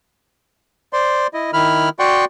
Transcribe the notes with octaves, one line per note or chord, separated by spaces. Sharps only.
C5 D5 C6
E4 D#5
D#3 E4 B5 F6
F#4 D5 F#5 G5 C6 C#6